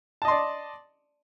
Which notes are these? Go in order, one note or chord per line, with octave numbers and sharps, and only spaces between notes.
D5 D#5 A5 C6